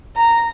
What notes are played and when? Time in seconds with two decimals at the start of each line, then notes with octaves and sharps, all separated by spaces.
0.16 A#5